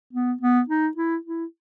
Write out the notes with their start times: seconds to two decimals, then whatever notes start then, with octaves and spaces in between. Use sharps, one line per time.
0.13 B3
0.41 B3
0.69 D#4
0.97 E4
1.26 E4